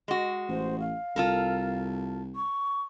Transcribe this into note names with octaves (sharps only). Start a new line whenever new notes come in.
G#3 F#4
A1 C5
F5
C2 F4 A4 A#4
C#6